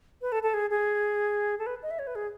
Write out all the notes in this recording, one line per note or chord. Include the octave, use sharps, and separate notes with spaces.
B4
A4
A4
G#4
G#4
A4
B4
D#5
E5
C#5
B4
G#4